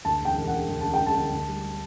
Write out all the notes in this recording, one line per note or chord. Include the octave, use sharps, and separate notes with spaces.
D2 A5
E1 G5
E1
F#5
D3
D2
E1 A5
G5
E1
A5
D3
D2
G3